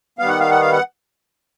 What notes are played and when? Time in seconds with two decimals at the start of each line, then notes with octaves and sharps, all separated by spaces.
0.19 D#3 G3 B3 F5
0.29 F#5
0.40 F5
0.51 F#5
0.61 F5
0.72 F#5